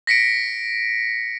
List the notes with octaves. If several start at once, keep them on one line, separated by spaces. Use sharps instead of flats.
A#6 B6 C#7 D7